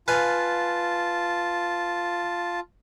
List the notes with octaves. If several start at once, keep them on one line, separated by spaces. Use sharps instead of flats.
F4 B4 F5 G#5 A5